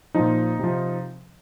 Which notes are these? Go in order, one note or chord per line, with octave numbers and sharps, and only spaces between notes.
A#2 F3 D#4
C3 F3